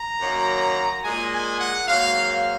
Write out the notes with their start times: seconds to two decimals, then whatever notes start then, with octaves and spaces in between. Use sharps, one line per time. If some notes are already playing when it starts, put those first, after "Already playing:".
Already playing: A#5
0.19 F#2 D#3 F#3 A#3
1.03 A#2 G#3 G#5
1.32 G#5
1.60 F#5
1.88 G#2 F#3 A#3 F5